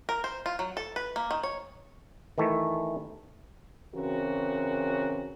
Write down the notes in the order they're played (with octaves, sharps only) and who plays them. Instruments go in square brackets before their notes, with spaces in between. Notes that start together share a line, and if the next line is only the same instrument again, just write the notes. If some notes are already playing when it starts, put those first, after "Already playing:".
[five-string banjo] A#4
C5
F4
F#3
A4
B4
A#3
D#3
C#5
[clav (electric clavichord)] D#3 E3 A3
[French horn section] C#3 E3 C4 F#4 A#4